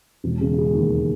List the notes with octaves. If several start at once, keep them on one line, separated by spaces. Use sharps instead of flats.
E1
C#3
G#3
D#2